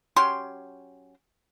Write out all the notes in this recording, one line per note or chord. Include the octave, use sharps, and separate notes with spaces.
F#3 C#4 G4 C6